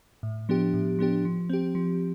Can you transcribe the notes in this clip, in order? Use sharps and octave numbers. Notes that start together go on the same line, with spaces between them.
A2
F3 B3 D4 G4
A2
F3 B3 D4 G4
F3
C4 G4
F3